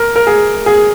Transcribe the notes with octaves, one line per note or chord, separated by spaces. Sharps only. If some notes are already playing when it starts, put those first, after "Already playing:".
Already playing: A#4
A#4
G#4
G#4